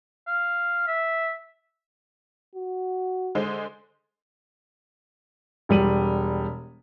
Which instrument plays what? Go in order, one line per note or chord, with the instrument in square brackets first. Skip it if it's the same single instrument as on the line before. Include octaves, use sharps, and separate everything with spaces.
[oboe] F5
E5
[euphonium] F#4
[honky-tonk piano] D3 G#3 C5
[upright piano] E1 G3 D#7 F#7